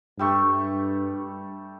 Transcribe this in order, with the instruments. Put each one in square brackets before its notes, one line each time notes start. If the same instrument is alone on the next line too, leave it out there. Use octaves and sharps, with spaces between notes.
[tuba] G2 [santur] G3 A3 C#6